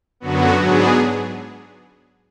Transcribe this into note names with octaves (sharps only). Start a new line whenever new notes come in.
F#2 D3 F#3 B3 F#4
G#2 F#3 B3 D4 G#4